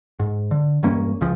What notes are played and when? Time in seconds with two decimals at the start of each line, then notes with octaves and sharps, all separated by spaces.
0.20 G#2
0.51 D3
0.83 E1 G2 A#3 C#4
1.21 C#2 C#3 F3